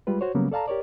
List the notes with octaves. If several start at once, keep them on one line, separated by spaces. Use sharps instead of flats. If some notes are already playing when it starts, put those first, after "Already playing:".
G3 G#3 F4 B4
F#4 C5 C#5
C#3 F#3 G3 A#3 B3 C#4
A4 D5 F5 A5 A#5
G4 A#4 C#5 D5